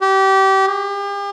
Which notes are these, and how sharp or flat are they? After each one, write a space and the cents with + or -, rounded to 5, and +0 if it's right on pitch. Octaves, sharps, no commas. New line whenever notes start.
G4 -25
G4 +40